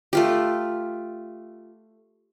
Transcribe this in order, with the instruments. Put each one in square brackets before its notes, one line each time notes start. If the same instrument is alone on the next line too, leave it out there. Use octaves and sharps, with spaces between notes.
[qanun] A3 F4 G4